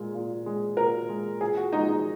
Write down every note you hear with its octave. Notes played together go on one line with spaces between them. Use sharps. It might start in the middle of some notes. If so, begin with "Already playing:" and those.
Already playing: A#2 G#3
A#2
G#3
A#2 A#4
G#3
A#2 G#4
F#4
G#3 D#4
F3
D#4